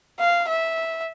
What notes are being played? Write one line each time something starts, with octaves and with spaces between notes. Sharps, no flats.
F5
E5